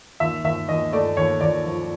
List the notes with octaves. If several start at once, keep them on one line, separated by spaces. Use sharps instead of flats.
D#2 E5
D#2 E5
D#2 D#5
A3 D5
D#2 C#5
D#2 D5
F3